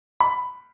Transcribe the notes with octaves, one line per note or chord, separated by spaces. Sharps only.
B5